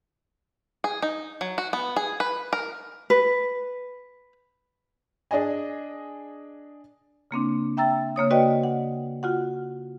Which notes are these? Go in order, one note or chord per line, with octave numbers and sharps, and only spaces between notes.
G#4
D#4
F#3
F#4
B3
G#4
B4
A#4
B4
D4 G#4 D#5 G#5
C#3 A#3 C4 D4
E5 G5 A#5 E6 A6
C#3 A#3 C#5 D#6
F#4 B4 D5 D#5 G5
F#5
F4 F#4 F#5